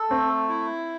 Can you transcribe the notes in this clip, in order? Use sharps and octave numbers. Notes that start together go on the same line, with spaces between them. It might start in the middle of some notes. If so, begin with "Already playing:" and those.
Already playing: A4
A3 C4
E4